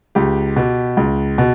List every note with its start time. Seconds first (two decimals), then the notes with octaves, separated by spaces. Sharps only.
0.15 C#2 G4
0.56 B2
0.97 C#2
1.38 B2